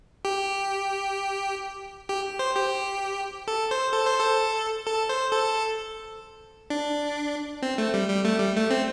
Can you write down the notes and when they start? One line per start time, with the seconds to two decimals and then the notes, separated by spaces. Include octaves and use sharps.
0.25 G4
2.09 G4
2.39 C5
2.56 G4
3.48 A4
3.71 C5
3.93 A4
4.07 C5
4.20 A4
4.87 A4
5.09 C5
5.32 A4
6.70 D4
7.62 C4
7.78 A3
7.94 G3
8.10 G3
8.25 A3
8.40 G3
8.56 A3
8.71 C4